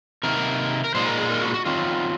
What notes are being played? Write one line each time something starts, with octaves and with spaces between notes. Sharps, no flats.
C3 D#3 A#3 A#4
A#4
A#2 G#3 D#4 C5
A#4
G#4
A#4
F#4
F#4
D#3 F#3 C4 F4